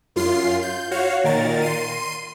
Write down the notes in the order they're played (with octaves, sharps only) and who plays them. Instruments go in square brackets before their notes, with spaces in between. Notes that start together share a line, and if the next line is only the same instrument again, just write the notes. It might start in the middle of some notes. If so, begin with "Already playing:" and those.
[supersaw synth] F#2 F4 C6 C7
G6
F#4 C#5 F5
A#2 D#3 A#4 A6
C6 C7 D#7